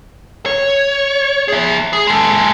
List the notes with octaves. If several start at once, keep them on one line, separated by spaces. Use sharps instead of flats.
C#5
G#4 E5
G#4
G#3 A4